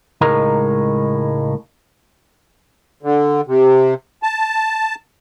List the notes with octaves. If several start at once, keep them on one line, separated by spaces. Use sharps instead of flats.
C#2 A2 G#3 D#4 A#4 A#5
D3
C3
A5